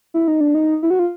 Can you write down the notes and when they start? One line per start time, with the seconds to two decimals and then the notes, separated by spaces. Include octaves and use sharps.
0.14 E4
0.28 D#4
0.41 D4
0.54 D#4
0.83 E4
0.90 F#4
0.99 F4